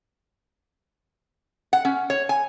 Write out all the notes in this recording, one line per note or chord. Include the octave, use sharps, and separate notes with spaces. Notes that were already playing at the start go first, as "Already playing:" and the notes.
F#5
C#4
C#5
G#5